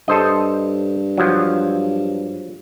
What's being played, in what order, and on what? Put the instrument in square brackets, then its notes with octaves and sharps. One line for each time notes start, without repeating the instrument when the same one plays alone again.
[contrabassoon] G2 [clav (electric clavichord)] A4 C5 D#5
[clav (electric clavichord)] F3 F#3